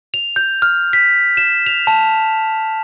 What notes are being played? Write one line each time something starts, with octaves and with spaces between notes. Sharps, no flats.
F7
G6
F6
B6
E7
F7
A5